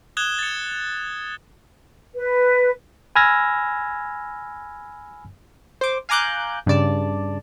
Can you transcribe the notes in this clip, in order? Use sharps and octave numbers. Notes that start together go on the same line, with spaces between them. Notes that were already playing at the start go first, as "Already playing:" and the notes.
D#6 F#6 G#6 E7 G7
A6 C#7
B4
G#5 B5 E6 F6 G#6 A#6
C5 D6
F5 G#5 A#5 D6 F#6 G6
G2 C#3 D5 A5